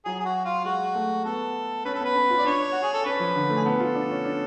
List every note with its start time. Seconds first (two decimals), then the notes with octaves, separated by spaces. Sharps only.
0.05 F#3 G#4
0.20 G#4
0.25 F#4
0.45 F4
0.65 G#3 F#4
0.95 A3
1.25 B3 A4
1.85 C#4 B4
1.95 A4
2.00 B3 B4
2.15 C#4
2.30 F4
2.38 D5
2.45 D4 C#5
2.72 F#4
2.83 G#4
2.94 A4
3.05 C#4 B4
3.20 F3
3.35 D3
3.50 A3
3.56 G#4
3.64 B3 A4
3.80 F4
3.95 D4
4.10 C#4
4.25 D4